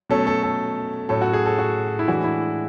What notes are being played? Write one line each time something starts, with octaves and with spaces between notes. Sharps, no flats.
B2 F#3 A3 C#4 A4
A4
A4
A2 F#3 C#4 A4
F#4
G#4
A4
F#4
E4
A2 E3 G#3 D4 F#4
E4